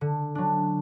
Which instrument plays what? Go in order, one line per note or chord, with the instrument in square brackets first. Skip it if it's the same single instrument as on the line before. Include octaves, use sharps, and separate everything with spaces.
[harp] D3
F#3 D4